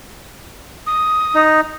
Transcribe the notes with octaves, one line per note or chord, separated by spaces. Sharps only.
D#6
D#4